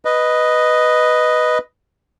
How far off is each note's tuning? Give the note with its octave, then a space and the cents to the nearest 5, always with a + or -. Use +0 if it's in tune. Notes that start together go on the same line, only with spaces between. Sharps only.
B4 +0 D#5 +0